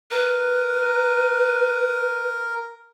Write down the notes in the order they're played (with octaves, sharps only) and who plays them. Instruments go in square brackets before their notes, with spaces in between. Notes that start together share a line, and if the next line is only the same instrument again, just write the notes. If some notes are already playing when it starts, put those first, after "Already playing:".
[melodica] A#4 [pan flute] B4